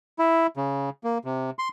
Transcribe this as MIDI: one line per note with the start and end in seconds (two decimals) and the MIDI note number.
0.19 0.47 64
0.57 0.90 49
1.04 1.18 58
1.25 1.50 48
1.59 1.69 84